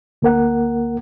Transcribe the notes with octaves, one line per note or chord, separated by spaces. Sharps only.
D2 A#3 A#4 F#5